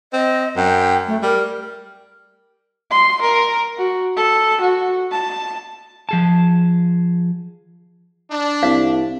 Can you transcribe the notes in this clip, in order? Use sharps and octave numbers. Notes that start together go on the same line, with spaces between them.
C4 D#5
F#2 G5
A3
G3 A#4
C6
A#4
F#4
A4
F#4
A5
F3 G#4 A5
D4
C2 F5